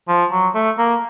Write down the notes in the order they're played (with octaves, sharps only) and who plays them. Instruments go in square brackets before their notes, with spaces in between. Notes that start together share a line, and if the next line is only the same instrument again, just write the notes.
[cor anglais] F3
F#3
A3
A#3